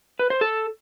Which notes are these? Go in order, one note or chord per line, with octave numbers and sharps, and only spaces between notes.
B4
C5
A4